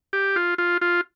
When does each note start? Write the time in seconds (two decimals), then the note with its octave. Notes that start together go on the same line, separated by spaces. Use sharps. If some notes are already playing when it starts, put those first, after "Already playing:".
0.13 G4
0.36 F4
0.58 F4
0.81 F4